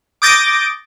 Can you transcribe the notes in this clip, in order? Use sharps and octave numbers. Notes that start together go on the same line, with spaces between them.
D6 D#6 G6 A6 A#6 D7